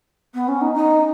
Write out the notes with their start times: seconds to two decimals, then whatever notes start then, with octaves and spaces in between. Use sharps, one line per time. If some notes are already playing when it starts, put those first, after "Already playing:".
0.34 B3
0.48 C#4
0.61 D#4
0.74 D#4